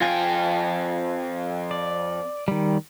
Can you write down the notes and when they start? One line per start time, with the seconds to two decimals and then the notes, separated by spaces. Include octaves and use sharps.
0.01 F2 F4 G5 G#5
1.71 D5
2.48 D#3 G3